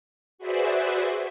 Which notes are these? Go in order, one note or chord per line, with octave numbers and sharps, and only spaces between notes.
F#4 G#4 B4 C5 D5 E5